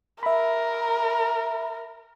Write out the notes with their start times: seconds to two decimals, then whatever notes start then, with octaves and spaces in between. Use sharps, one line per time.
0.23 A#4 E5 B5